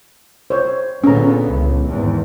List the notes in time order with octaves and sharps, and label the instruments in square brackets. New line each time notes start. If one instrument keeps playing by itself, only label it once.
[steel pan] C5 C#5
[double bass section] A#2 D3 B3 [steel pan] C#4 A#5
[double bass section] C#2
G#1 E2